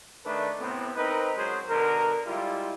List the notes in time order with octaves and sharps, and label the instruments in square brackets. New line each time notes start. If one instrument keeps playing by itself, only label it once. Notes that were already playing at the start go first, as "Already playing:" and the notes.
[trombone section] D#3 A3 D4 A4 B4
A2 C3 B3 C4
C4 D#4 A#4 B4
F#2 F#3 G#3 G#4 C5
B2 D3 A#4
G3 G#3 E4 F4